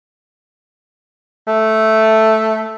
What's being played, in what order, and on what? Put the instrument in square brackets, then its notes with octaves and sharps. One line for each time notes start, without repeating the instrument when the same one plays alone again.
[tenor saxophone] A3